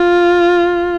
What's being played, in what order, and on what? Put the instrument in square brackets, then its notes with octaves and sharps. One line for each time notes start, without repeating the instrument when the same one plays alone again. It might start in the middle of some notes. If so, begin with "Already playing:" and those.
Already playing: [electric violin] F4